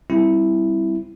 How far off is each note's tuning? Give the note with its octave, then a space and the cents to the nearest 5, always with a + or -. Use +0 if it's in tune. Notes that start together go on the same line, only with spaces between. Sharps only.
G3 +0 C4 +0 E4 +0